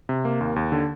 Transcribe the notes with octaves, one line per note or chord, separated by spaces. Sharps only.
C3
A#3
D#2
D#2
D3